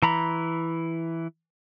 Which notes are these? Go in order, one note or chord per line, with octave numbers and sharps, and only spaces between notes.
E3 A#5 B5